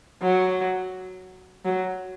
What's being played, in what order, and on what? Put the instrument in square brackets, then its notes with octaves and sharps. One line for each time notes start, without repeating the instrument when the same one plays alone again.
[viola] F#3
F#3